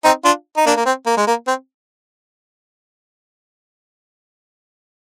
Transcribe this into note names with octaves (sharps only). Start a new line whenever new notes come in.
C4 D#4
D4 F4
D#4
A#3 D4
A#3
C4
A#3
G#3
A#3
C4